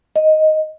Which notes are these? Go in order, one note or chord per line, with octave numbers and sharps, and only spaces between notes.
D#5